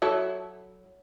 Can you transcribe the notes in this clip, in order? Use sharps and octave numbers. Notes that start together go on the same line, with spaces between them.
F#3 E4 A4